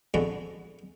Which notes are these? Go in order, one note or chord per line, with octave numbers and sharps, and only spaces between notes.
F2 D3 G#3 B3 C#6